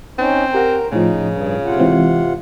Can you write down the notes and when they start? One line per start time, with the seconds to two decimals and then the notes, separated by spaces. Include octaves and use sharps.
0.19 C4 C#4 D#4
0.54 G4 A#4 F#5 A#5
0.92 A2 C#3 F3 D#4
1.29 G2
1.65 C3 F4 F#5
1.80 E3 G#3 C4